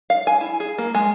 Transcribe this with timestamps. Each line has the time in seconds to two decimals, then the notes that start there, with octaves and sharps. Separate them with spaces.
0.10 F5
0.27 G#5
0.41 E4
0.60 G#4
0.78 A#3
0.95 G#3